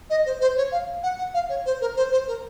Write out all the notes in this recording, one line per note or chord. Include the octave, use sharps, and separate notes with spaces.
D#5
C5
C5
C#5
F5
F#5
F#5
F5
C#5
C5
A#4
C5
C5
A#4